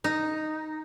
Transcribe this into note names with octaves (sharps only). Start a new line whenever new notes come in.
D#4